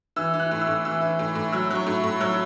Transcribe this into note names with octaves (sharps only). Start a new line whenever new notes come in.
E3 E6
E3
F#6
A2
E6
A2
E3 E6
E3
A2
A2
F#3 E6
F#3 C#6
A2
A2
F#3 E6